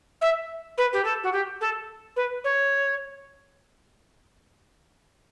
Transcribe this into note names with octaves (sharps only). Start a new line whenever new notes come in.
E5
B4
G4
A4
F#4
G4
A4
B4
C#5